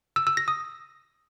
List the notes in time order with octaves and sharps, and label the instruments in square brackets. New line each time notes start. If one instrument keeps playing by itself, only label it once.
[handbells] E6
E6
A#6
D#6